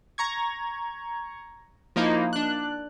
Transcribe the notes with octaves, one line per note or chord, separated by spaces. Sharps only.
A#5 C#6 G#6
F3 A#3 D#4 E4
D4 F#6